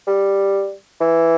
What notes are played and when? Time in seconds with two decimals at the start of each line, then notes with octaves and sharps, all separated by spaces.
0.07 G3
1.01 E3